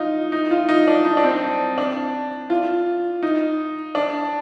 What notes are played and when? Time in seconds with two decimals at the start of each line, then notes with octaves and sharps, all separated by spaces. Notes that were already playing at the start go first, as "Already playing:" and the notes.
Already playing: D#4 F4
0.32 D#4
0.51 F4
0.69 D#4
0.87 D4
1.05 D#4
1.17 D4
1.24 C4
1.78 D4
2.50 F4
3.23 D#4
3.95 D4